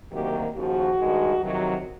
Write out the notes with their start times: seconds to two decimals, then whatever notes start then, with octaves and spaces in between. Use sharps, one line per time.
0.11 D2 C3 D#3 F#3 A#3 G4
0.54 D#2 C#3 F3 F#4
0.98 G2 D#3 G#3
1.42 F2 C3 D#3 F#3